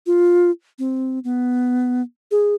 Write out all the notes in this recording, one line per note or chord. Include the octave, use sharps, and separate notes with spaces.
F4
C4
B3
G#4